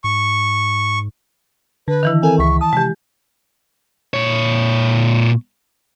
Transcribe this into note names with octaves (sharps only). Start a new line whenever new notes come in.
G#2 C#6
D3 B4
D#3 E3 E4
C4 A4 A#4 G#5
C#2 E5 C#6 B6
A5 D#6
C3 G#3 G4
A#2 C#5